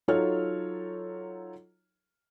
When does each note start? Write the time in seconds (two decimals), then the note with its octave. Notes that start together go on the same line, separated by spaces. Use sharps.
0.08 F#3 D#4 F4 A4 C#5 F6